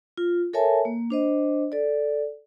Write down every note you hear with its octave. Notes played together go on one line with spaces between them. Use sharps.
F4
A4 A#4 C#5 E5 G#5 A5
A#3
D4 C5 D#5
A4 D5